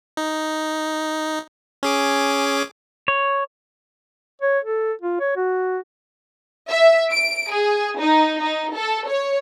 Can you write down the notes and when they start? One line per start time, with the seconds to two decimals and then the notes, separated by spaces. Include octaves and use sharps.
0.17 D#4
1.83 C#4 G#4 D6
3.08 C#5
4.42 C#5
4.65 A4
5.02 F4
5.20 C#5
5.36 F#4
6.69 E5
7.12 D7
7.53 G#4
7.99 D#4
8.41 D#4
8.76 A4
9.09 C#5